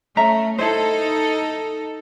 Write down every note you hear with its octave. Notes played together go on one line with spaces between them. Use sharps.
A3 C#4 E5 A#5
D#4 E4 A4 C5